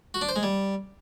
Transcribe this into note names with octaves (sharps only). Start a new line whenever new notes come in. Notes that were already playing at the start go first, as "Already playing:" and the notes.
F#4
D4
C5
G#3
G3